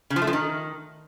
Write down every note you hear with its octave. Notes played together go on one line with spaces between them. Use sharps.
C#3
F3
A3
F3
D#3